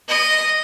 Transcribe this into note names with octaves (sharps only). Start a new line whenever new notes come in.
D#5